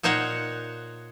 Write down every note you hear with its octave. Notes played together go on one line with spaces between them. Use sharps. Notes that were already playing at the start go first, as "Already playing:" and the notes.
A#2 D#4 C5 C#5 F#5